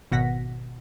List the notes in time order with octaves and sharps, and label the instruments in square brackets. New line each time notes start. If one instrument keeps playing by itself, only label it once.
[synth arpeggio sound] G#1 B2 F#5 A#6 B6